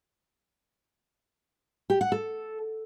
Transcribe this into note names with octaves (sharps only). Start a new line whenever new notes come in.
G4
F#5
A4